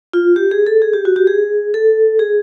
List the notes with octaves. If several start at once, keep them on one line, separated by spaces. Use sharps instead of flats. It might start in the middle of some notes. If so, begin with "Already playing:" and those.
F4
G4
G#4
A4
G#4
G4
F#4
G4
G#4
A4
G#4